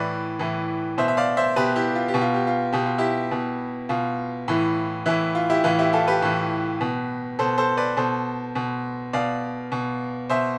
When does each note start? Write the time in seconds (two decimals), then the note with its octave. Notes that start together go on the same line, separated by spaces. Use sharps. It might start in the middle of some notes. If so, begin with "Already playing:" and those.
Already playing: A2 E3 B4 D5
0.39 A2 E3
0.98 B2 C5 E5
1.08 E5
1.17 D5 F5
1.37 C5 E5
1.56 B2 G4 B4
1.76 E4 G4
1.95 F4
2.08 G4
2.14 B2
2.21 F4
2.34 G4
2.47 F4
2.73 B2 G4
2.86 F4
2.98 E4 G4
3.31 B2
3.89 B2 F4
4.48 A2 E3
5.06 A2 E3 E4
5.35 F4
5.50 E4 G4
5.64 A2 E3 F4
5.79 E4 G4
5.93 F4 A4
6.08 G4 B4
6.22 A2 E3
6.81 B2
7.39 B2 A4 C5
7.58 A4 C5
7.77 B4 D5
7.97 B2 A4 C5
8.55 B2
9.13 B2 D5 F5
9.72 B2
10.29 B2 C5 E5